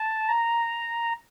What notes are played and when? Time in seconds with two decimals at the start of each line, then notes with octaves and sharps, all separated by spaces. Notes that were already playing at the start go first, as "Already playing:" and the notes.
Already playing: A5
0.28 A#5